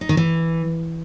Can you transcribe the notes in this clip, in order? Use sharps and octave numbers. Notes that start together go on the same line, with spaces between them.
D#4
D#3
E3